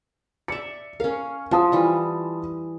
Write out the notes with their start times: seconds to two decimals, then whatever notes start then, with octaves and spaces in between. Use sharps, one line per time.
0.48 D5 E5 C#7
1.00 C#4 A#4 F5
1.51 F3 F4 A5 D#6
1.72 E3 G3